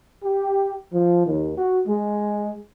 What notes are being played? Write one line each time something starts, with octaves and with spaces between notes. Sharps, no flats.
G4
F3
D#2
F#4
G#3